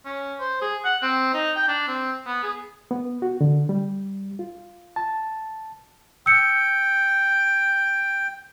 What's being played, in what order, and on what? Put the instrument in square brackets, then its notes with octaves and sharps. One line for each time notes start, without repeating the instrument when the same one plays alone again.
[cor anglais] C#4
C5
G#4
F#5
C4
D#4
G5
D4
C4
B3
G#4
[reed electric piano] B3
F#4
D3
G3
F4
A5
[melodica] G5 [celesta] E6 C#7